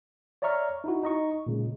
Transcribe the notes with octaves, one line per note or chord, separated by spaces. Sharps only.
C#5 D5 E5 A#5 C#6 F6
D#4 E4 F#4
D#4 D#5 C#6
A#2 C#3 G#3